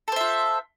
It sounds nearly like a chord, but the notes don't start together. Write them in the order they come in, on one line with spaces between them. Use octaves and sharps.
A4 C5 E5 F4